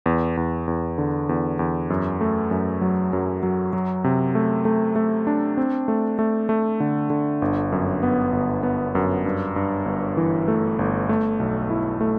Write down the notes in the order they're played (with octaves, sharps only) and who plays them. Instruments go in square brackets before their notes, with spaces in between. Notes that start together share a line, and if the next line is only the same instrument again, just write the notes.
[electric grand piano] E2
E2
E2
D3
E2
E2
F#2
A3
F#2
F#3
F#2
F#3
F#3
C3
A3
A3
A3
D4
C4
A3
A3
A3
D3
D3
G1
F#2
B3
G1
B3
F#2
G2
G2
G1
E3
A3
G1
A3
B1
E4
A3